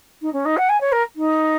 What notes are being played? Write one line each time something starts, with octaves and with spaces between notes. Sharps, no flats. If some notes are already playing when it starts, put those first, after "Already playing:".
D#4
C#4
D#4
F#5
G#5
C#5
A#4
D#4